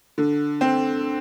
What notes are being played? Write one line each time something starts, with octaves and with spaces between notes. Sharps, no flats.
D3
C4